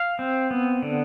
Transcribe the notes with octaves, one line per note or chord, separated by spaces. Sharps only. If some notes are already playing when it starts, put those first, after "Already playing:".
Already playing: F5
C4
B3
D3